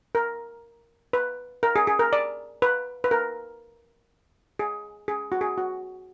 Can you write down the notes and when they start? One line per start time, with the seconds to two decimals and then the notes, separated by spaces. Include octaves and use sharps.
0.15 A#4
1.13 B4
1.63 A#4
1.76 G#4
1.87 G#4
1.99 A#4
2.13 D5
2.62 B4
3.04 B4
3.11 A#4
4.59 G#4
5.08 G#4
5.32 F#4
5.41 G#4
5.58 F#4